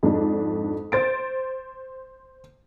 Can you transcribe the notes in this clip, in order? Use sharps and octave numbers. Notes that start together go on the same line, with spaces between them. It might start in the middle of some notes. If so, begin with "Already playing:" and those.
F2 G#2 D4
C5 A6 D7